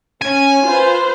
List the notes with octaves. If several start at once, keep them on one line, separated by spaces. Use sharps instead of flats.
C#4 G#5
F4 B4 C5